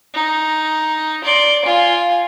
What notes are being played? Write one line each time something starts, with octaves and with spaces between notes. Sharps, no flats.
D#4
D5 C6
F4 G#5